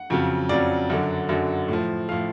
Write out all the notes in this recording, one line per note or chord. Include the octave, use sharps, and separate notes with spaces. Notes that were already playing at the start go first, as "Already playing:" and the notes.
Already playing: F#5
F2 C#3 F#3
F2 C#3 F#3 D5
F#2 D3 F#3
F#2 D3 F#3
A2 F3
A2 F3 F5